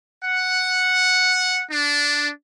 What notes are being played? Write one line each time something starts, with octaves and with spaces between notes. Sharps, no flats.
F#5
D4